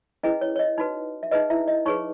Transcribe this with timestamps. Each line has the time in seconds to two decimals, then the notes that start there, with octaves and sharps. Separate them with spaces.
0.23 C#4 E4 G#4 B4 D#5
0.41 C#5
0.56 C#5
0.59 D#5
0.78 D#4 F#4 B4
1.23 E5
1.31 D#4 G#4 B4 D#5
1.50 E4 E5
1.68 D#5
1.86 D#4 G#4 B4 C#5 C#6